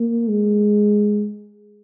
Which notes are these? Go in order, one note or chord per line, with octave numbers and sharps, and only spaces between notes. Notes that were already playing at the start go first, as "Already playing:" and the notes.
Already playing: A#3
G#3